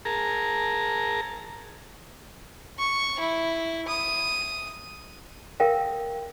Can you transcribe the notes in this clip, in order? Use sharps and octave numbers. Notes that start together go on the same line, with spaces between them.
G#4 A#4 A5 A#5
C#6
E4
D#6
A4 A#4 E5 F5 G5